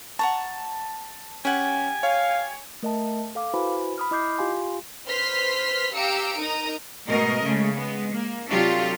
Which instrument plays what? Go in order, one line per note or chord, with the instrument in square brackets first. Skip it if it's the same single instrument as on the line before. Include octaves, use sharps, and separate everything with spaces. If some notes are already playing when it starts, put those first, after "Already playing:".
[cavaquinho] F#5 A#5 C#6 [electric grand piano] A5
[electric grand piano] C#4 [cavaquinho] G4 F#5 [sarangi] G#5
[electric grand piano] C#5 [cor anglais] F5
[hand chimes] A3 A#4 D#5 E5 A5
A4 F5 D6
E4 F#4 B4 C5 G#5 B5
B5 D#6 F6
E4 D#5 D6 G6 C7
F4 G4 F5 G#5 C6
[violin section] B4 C5 C6 F6 B6
G4 F5 A#5 E6 C#7 D7
D#4 A#4 A#5 D#6
[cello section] G#2 B2 A3 A#4 D#5
C#3 G#3 A3
G#3 B3
A#3
C3 F#3 D4 F4 G4 A4